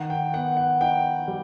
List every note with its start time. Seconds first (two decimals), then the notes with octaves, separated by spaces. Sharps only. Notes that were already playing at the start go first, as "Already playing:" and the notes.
Already playing: D#3 F#5
0.10 G5
0.34 B3 F#5
0.57 F#5
0.81 D#4 G5
1.28 G3